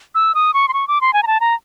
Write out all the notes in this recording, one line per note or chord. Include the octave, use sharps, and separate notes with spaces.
E6
D#6
C#6
C6
C#6
D6
C6
G#5
A#5
A5
A#5